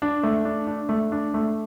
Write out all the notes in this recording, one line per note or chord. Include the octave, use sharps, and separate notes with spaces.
D4
A3
D4
D4
A3
D4
A3